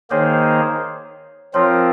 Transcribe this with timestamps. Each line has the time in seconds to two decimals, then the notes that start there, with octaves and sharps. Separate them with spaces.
0.10 D#3 A#3 D#4 G#4 C5 C#5
1.54 F3 C4 F4 A#4 C#5